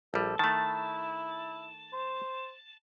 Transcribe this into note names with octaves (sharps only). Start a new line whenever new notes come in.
A#1 G3 A4
D#3 A3 E4 A5
C5